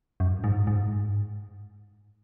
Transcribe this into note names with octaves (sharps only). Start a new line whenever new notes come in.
F#2
G#2
G#2